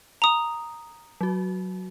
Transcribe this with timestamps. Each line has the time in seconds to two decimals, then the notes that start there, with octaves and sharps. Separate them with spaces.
0.22 A#5 D#6
1.21 F#3 F#4